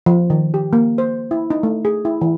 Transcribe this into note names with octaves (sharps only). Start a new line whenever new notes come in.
F3
D#3
G4
A#3
C5
E4
D#4
A3
G#4
E4
E3